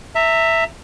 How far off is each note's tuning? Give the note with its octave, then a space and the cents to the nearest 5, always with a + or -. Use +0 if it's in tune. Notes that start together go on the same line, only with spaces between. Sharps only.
E5 +0 A#5 -35